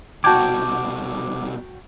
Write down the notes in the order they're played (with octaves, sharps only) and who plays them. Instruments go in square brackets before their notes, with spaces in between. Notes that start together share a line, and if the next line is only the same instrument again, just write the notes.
[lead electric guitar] C2 B2 [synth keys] F#4 G5 [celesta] A5 G6 G#6 [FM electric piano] D6